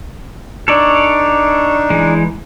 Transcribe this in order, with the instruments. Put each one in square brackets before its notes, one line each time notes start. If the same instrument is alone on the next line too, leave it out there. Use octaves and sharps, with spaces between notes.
[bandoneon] D4 D#4 [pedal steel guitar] A4 C#5 D5
[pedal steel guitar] E3 G#3